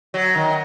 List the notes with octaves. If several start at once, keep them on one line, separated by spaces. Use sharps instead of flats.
F#3
D#3